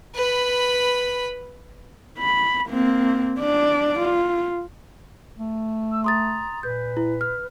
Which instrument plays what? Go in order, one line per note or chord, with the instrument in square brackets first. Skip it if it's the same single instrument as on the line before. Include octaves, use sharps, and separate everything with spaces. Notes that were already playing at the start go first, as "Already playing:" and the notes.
[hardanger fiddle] B4 B5
[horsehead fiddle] B5
A#3 C4
D4 D5
F4
[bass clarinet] A3
[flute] E6
[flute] A#5 [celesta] C6 D#6 A6
[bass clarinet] A#2 [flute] B4 [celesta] G6
[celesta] E4
F6